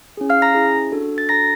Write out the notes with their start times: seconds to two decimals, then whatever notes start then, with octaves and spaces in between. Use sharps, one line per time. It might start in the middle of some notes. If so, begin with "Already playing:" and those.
0.17 C#4 E4 G#4
0.30 F5 F6
0.42 A#5 A#6
0.55 C#4 E4 G#4
0.92 D4 F#4 A4
1.18 A6
1.29 D4 F#4 A4 A#5 A#6